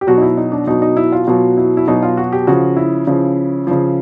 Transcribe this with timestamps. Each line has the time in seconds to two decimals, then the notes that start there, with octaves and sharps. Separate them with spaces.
0.01 G4
0.07 B2 F#3 F#4
0.17 D#4
0.22 E4
0.37 D#4
0.52 D4
0.67 B2 F#3 D#4
0.82 D#4
0.97 E4
1.12 F4
1.27 B2 F#3 F4
1.57 E4
1.77 E4
1.88 B2 F#3 D#4
2.03 F4
2.17 F#4
2.32 G4
2.47 C#3 F3 F#4
2.76 E4
3.07 C#3 F3
3.67 C#3 F3